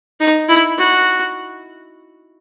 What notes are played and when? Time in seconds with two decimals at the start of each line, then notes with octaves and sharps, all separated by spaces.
0.20 D#4
0.48 E4
0.78 F#4